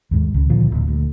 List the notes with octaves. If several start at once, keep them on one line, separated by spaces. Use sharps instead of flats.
D#2 G#2
C#2 C#3
A#2 D3 D#3 F3
D1 A#2
D2